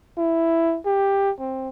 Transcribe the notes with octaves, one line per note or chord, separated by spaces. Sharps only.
E4
G4
C4